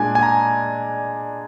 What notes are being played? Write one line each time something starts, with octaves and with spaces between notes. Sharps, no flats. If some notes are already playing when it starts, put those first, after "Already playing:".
Already playing: A#2 G#3 D4 G#5
G#5
A#5